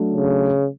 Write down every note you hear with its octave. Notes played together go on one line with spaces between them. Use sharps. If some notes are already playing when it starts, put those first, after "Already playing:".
Already playing: F#3 A3 D4
C#3